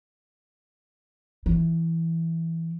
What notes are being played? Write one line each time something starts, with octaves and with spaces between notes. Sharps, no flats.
E3